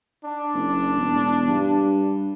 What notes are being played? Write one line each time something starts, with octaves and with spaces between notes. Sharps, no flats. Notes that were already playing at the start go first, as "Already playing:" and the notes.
D4
F#1
E1
G2